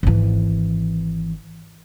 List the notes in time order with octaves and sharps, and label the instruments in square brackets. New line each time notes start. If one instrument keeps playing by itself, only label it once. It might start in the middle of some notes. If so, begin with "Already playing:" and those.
[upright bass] G#1 E3